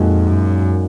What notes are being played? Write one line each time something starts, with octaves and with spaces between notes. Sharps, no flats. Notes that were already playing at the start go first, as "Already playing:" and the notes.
Already playing: F2 A#2 G#3 D#4 F#4
F#2